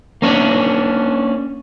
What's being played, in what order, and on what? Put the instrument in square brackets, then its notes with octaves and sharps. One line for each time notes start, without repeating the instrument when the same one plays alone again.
[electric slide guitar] A#3 C#4 D4